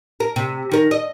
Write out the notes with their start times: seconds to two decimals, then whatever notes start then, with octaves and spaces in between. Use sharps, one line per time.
0.20 A#4
0.36 C3
0.72 D#3 A#4
0.91 D#5